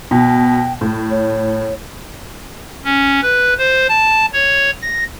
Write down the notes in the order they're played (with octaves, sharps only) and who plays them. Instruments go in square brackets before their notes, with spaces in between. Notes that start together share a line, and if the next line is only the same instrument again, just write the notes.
[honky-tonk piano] B2 [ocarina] G5
[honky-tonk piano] A2
[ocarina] C#5
[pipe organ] C#4
B4
C5
A5
C#5
A#6